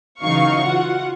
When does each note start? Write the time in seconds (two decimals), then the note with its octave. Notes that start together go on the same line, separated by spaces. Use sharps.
0.21 C#3 E3 F#3 D#4 F5 C#6
0.65 F4 F#4 F#5